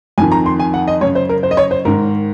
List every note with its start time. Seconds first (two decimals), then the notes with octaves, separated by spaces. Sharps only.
0.18 F2 D#3 G#5
0.32 A#5
0.46 C6
0.59 G#5
0.74 F#5
0.88 D#5
1.01 F#2 C#3 C#5
1.15 C5
1.29 A#4
1.43 C5
1.51 D#5
1.57 C#5
1.71 C5
1.85 G#2 D#3 A#4